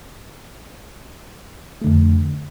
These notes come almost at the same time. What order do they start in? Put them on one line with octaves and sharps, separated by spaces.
A3 D3 F2